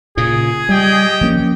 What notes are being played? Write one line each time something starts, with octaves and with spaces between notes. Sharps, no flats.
A#2 C#3 G#4
G3 G4 D#5 G5
F3 A#3 C#4